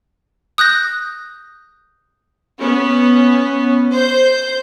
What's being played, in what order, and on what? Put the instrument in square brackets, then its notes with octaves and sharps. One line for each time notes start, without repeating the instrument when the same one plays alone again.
[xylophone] D#6 F#6 G6 A#6
[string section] B3 C#4
C5 G6